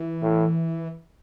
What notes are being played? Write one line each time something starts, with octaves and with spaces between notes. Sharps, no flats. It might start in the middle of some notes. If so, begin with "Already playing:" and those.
Already playing: E3
A2